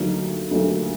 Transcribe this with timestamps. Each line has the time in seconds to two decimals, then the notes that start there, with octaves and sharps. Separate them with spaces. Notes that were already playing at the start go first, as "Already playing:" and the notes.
Already playing: D2 D3 F#3 A#3 D#4
0.51 D2 D3 F#3 A#3 D#4